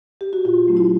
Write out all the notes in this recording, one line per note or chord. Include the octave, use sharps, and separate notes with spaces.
G4
F#4
A#2 F4
F#3 A3 C#4
E4